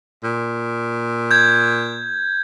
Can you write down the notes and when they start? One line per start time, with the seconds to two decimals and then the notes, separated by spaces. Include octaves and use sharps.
0.23 A#2
1.31 G6 G#6